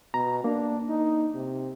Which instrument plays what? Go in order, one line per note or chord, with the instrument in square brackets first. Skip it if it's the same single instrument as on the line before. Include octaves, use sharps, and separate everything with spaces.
[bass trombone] B2 [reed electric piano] A#5
[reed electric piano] A#3 [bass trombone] D4
[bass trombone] D#4
C3